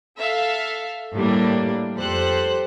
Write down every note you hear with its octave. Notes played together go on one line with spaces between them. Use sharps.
A4 E5 F5
A2 G3 A#3 D4
F2 G4 A4 C5 F#6